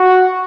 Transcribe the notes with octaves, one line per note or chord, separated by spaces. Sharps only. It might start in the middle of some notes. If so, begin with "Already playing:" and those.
Already playing: F#4